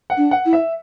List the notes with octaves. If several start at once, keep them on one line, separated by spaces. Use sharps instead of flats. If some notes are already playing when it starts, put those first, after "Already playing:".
F#5
D4
F#5
E4
E5